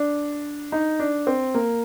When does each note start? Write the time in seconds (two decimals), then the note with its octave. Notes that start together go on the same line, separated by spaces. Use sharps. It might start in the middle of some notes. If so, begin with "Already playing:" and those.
Already playing: D4
0.72 D#4
0.99 D4
1.27 C4
1.55 A#3